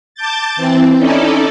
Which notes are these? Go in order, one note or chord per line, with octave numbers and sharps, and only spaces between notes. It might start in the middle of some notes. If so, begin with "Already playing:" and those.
A5 D6 G6 A6
E3 C4
C#4 D#4 E4 A4 D5